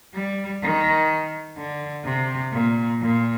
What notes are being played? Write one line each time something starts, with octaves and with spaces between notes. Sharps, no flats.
G3
D#3
D3
C3
A#2
A#2